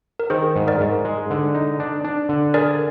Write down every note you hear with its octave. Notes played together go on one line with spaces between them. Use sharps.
A#4
D#3 G#4 C5
G#2
A#4 D5
G#2
G#3
D3
D#4
D4
D4
D3
G#4 A#4 D5